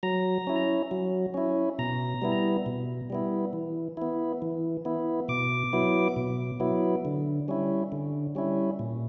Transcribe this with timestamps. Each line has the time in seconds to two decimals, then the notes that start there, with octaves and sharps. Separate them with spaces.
0.03 F#3 A#5
0.47 C#4 E4
0.91 F#3
1.34 C#4 E4
1.79 B2 A#5
2.22 G3 B3 E4
2.66 B2
3.10 G3 B3 E4
3.53 E3
3.97 B3 E4
4.42 E3
4.85 B3 E4
5.28 B2 D6
5.73 F#3 B3 E4
6.16 B2
6.60 F#3 B3 E4
7.05 D3
7.48 G3 C#4 E4
7.92 D3
8.35 G3 C#4 E4
8.79 A#2